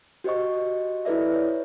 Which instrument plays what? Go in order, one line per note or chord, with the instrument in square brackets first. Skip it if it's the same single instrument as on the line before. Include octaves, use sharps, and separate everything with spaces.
[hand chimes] F#4 G4 C5 D#5 C#6
E4 A4 B4 D5 E5
C#5